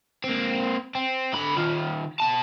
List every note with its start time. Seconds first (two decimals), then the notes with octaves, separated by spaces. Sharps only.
0.24 A#3 C4
0.95 C4
1.34 D3 B5
1.58 D#3 F4
2.20 B2 A5